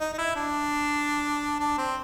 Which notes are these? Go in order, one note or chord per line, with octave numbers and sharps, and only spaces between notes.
D#4
D#4
E4
D4
D4
C4